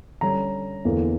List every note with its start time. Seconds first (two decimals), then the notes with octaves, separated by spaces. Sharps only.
0.21 D3 G3 C#4 A#5
0.85 E2 D3 A#3